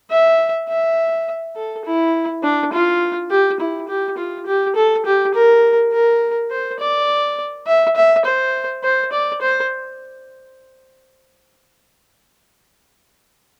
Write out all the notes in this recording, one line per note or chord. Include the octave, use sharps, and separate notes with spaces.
E5
E5
A4
E4
D4
F4
G4
E4
G4
F4
G4
A4
G4
A#4
A#4
C5
D5
E5
E5
C5
C5
D5
C5